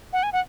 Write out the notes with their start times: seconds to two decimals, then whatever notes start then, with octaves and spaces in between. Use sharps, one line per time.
0.13 F#5
0.23 G#5
0.33 F#5